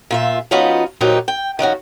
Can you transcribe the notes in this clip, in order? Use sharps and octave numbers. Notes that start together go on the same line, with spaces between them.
A#2 F4 E5
F3 B3 C#4 D#4 F4 F#4
D#2 A#2 F3 F#3 D#4 G4
G5
D#3 F3 C#4 F#4